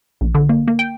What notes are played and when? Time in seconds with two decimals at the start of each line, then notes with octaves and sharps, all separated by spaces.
0.21 A#1
0.35 D3
0.49 A#3
0.68 A#3
0.79 G5